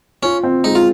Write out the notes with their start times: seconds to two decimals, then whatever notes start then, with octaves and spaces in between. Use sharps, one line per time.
0.23 C#4 F4
0.43 C4
0.64 G#3 D#4
0.75 F4